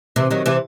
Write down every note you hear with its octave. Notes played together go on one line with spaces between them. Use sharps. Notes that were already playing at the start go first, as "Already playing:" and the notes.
C3 E3
D#3 F#3
C3 E3